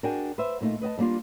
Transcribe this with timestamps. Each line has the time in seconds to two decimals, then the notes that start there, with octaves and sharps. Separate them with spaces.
0.03 D4 F#4 G#4 A#4 G5 G#5
0.38 B4 C5 E5
0.61 A#2 A3 D#4 F4
0.81 B4 D#5 G5 A5
0.98 A2 G3 A#3 D4 F4